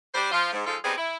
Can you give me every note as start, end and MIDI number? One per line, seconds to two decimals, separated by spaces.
0.15 0.30 55
0.15 0.30 62
0.15 0.30 72
0.32 0.51 53
0.32 0.51 65
0.52 0.63 44
0.66 0.77 53
0.66 0.77 56
0.66 0.77 63
0.66 0.77 65
0.66 0.77 69
0.84 0.93 55
0.84 0.93 59
0.84 0.93 60
0.84 0.93 63
0.84 0.93 67
0.84 0.93 68
0.98 1.17 64